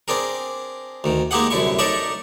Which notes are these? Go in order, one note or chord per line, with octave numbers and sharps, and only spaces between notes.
C4 D4 G#4 A#4
D2 D#3
G#3 A#3 D#4 G4 G#4 F#5
C2 F#2 D3 E4 C#6
D#4 A4 A#4 C#5 D5 E5